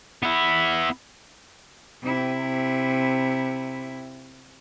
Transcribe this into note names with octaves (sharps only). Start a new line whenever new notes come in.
B3 E4
C3 E4